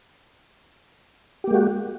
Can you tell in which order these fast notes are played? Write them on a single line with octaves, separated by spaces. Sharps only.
G4 A#3 G#3 F#4